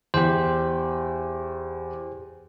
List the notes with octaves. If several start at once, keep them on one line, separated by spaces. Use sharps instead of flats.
E2 G4 C5